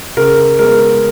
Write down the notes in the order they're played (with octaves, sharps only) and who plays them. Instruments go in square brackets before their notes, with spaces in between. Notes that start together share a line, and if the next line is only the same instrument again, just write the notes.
[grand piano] C#3 A#4
G#3 B3 A#4